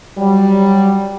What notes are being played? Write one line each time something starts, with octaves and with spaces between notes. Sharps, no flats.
F#3 G3